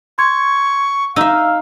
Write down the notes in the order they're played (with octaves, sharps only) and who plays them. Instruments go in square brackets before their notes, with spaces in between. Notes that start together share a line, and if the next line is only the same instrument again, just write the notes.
[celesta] C6 G#6 [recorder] C#6
[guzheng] D#4 E5 [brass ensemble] F5 [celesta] E6